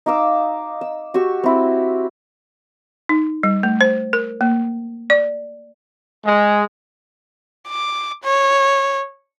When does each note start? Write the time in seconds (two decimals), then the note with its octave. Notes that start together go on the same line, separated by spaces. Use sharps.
0.06 D#4 F5 D6 E6
0.81 E6
1.14 F#4 G4 C#6 E6
1.44 C4 E4
3.09 D#4
3.43 G3
3.63 A3
3.81 C5
4.13 A#4
4.41 A#3
5.10 D5
6.24 G#3
7.69 D6
8.23 C#5